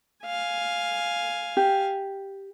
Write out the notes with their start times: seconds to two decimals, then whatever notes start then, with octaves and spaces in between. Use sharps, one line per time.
0.25 F5 G#5
1.57 G4